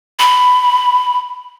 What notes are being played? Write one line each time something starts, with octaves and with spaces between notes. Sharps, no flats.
B5